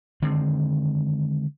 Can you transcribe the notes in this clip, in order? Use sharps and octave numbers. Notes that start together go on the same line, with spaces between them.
D3 D#3 G#3 C4